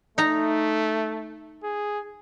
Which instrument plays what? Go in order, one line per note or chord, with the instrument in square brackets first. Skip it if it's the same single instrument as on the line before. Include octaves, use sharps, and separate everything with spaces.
[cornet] A3 [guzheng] D#4 A#5
[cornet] G#4